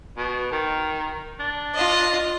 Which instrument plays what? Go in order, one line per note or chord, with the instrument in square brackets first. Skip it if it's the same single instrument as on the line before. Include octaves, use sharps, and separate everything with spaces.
[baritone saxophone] B2
D#3
D4
[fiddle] F4 D#5